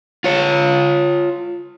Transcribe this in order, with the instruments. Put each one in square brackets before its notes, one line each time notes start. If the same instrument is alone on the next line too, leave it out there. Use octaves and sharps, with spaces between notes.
[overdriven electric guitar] F4 C#5